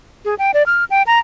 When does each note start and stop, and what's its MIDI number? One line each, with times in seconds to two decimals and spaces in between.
0.25 0.35 68
0.39 0.51 79
0.54 0.63 74
0.66 0.84 89
0.90 1.03 79
1.07 1.19 82